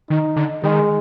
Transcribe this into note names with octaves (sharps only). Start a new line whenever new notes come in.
D#3 D#4
D3
D#3 G#3